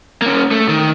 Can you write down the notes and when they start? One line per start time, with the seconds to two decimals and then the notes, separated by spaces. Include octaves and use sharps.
0.22 A#3 C#4
0.51 A3
0.68 D#3